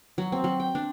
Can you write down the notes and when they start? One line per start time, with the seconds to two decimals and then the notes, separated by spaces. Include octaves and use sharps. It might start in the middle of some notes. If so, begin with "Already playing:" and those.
0.18 F#3
0.32 C4
0.44 F#3
0.60 G5
0.75 D4